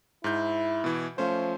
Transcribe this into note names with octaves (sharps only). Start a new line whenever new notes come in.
G#2 E4 G6
B2 E3
F3 A3 C#4 C5